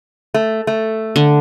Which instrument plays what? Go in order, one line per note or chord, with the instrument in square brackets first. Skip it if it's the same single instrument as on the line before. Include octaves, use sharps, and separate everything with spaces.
[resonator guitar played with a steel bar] A3
A3
[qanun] D3